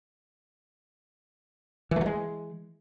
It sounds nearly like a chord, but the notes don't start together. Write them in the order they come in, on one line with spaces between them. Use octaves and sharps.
E3 A3 F#3 G#3